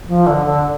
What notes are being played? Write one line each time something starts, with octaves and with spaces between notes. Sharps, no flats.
F3
D3
D3